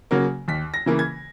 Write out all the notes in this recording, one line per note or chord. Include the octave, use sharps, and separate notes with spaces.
C#3 F#3 A#3
D#2 B6
A#6
C#3 E3 A#3
G#6